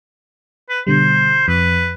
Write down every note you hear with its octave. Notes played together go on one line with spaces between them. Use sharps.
B4
B2 D3 G3 C5
F2 B4